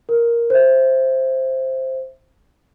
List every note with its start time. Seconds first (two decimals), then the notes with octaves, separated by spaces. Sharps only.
0.09 A#4
0.50 C5 E5